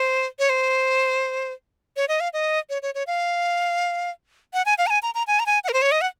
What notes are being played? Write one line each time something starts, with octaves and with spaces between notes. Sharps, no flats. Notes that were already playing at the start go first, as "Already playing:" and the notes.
Already playing: C5
C#5
C5
C#5
D#5
F5
D#5
C#5
C#5
C#5
F5
F#5
G#5
F5
A#5
G#5
A#5
A#5
G#5
A#5
G#5
F#5
A#4
C5
C#5
D#5
F#5